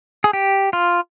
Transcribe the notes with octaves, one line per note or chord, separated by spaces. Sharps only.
G#4
G4
F4